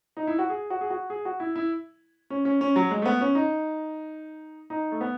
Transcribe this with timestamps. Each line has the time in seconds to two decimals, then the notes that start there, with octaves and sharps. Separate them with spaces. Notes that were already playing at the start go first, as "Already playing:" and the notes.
0.17 D#4
0.27 E4
0.39 F#4
0.49 G#4
0.70 F#4
0.81 G#4
0.90 F#4
1.10 G#4
1.25 F#4
1.40 E4
1.56 E4
2.30 C#4
2.45 C#4
2.61 C#4
2.76 F#3
2.91 G#3
3.02 A3
3.05 B3
3.21 C#4
3.35 D#4
4.70 D#4
4.92 A3
5.01 B3